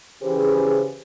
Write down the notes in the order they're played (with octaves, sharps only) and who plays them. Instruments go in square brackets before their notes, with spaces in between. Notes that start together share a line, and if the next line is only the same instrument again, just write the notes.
[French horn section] C#3 E3 G4 G#4 B4 C5